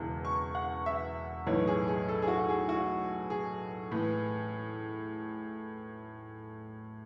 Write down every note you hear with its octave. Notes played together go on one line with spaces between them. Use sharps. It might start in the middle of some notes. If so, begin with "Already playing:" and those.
Already playing: E1 E2 C#3 E3
C#6
F#5
E5
B1 A2 E3 C#5
G#4
G#4
A4
G#4
F#4
G#4
F#4
G#4
A2 E3